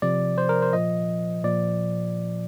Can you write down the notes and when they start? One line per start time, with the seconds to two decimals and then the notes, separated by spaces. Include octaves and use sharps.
0.02 C3 F3 D5
0.38 C5
0.49 A#4
0.62 C5
0.73 A#2 F3 D#5
1.44 A#2 F3 D5